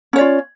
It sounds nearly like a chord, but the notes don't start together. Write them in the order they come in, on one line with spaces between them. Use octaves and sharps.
C#4 C#5 D5 F4